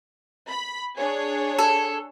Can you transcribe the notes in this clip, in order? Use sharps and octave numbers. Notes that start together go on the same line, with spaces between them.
B5
D4 G#4 C#5
A4